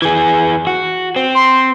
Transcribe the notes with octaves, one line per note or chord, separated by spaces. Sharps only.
E3 G#4
F#4
C4
C6